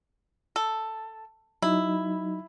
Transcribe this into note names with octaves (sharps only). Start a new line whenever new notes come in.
A4
F#3 D#4 E4